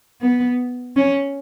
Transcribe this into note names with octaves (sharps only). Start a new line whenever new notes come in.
B3
C#4